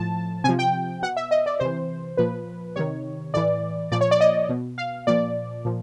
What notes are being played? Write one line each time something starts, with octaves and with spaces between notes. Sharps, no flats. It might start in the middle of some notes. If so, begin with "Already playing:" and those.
Already playing: A2 F3 A5
C3 F3 G#5
G5
B2 F#5
E5
D#5
D5
C3 E3 C5
A#2 F3 B4
C3 D#3 C#5
A2 E3 D5
A#2 F3 D5
C#5
D5
D#5
B2
F5
A#2 F3 D5
A#2 F3